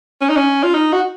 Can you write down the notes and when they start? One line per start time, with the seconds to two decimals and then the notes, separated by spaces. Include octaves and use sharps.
0.21 C#4
0.29 D#4
0.37 C#4
0.63 F4
0.74 D#4
0.93 F#4